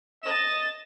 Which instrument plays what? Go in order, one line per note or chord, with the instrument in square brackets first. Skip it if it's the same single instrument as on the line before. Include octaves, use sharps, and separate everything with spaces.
[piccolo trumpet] D#5 [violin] A6 E7